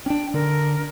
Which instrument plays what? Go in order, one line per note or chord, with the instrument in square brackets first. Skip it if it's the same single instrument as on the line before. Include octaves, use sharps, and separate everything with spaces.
[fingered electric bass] C#4 D4 [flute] G5
[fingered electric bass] D3 D4 [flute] A#4